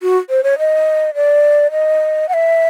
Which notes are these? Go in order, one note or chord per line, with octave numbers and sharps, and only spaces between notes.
F#4
C5
C#5
D#5
D5
D#5
F#5
E5